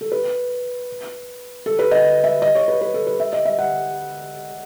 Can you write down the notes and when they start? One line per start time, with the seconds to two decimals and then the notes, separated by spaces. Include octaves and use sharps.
0.01 A4
0.12 B4
1.66 A4
1.79 B4
1.91 D#5
2.24 E5
2.42 D#5
2.55 C#5
2.68 B4
2.81 B4
2.94 A4
3.07 B4
3.20 E5
3.33 D#5
3.45 E5
3.59 F#5